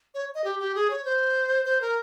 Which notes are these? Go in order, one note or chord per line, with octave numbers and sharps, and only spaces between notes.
C#5
D#5
G4
G4
G#4
C#5
C5
C5
A#4